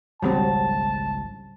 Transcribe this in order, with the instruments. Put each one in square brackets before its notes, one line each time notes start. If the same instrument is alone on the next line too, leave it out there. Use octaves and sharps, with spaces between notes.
[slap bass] G#1 C#2 D#3 [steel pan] F#3 G3 C4 [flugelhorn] A5